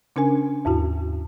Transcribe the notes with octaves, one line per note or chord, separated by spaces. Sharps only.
C#3 C#4 D4 A#4 G#5
D#2 G#2 E4 F#4